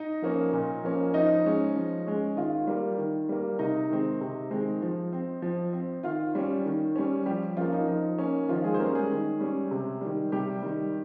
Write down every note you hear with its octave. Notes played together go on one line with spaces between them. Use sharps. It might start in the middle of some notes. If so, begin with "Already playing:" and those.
Already playing: D#4 D#5
F3 A#3 C#4
A#2
F3 A#3 C#4
F3 D#4 D#5
G#3 C#4
F3
G#3 C#4
D#3 F4 F5
G3 A#3
D#3
G3 A#3
C3 D#4 D#5
D#3 G#3 C4
C3
D#3 G#3 C4
F3
C4
F3
C4
D#3 F4 F5
G3 C#4
D#3
G3 C#4
F3 G3 G4
F3 A#3 C#4 F4
D#4
F3 D#4
A#3 C#4
D#3 F3 F4
G#3 G#4
C5
G3 A#3 C#4 A#4
G#3 G#4
D#3
G3 C#4
C3
D#3 G3
C3 G3 G4
D#3 G3